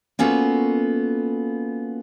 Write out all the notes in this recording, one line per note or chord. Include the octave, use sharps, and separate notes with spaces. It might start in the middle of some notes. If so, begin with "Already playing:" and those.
A#3 B3 C#4 F4 F#4 A4